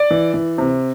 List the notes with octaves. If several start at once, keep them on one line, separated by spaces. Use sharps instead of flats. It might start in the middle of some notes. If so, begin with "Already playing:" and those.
Already playing: D5
E3
E3
C3